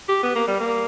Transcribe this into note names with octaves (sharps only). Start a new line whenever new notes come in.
G4
B3
A#3
G3
A#3